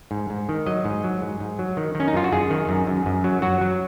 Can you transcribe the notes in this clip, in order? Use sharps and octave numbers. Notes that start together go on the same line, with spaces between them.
G#2
G#2
D#3
F#3 D#5
G#2
F#3
G#2
G#2
F#3
D#3
D#3
C#4
D#4
F#2 F4
F#4
F#2 G#4
D#3
F#2
F#2
F#2
F#3
F#3 F#4
F#3